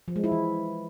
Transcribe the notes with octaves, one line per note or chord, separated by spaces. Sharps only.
F3
G#3
E4
E3